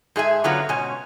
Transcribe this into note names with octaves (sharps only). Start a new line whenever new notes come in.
G#2 G#4 E5 G#5
D3 F#3 B3 C#4 F4 F#4
G#2 B2 C#4 G#5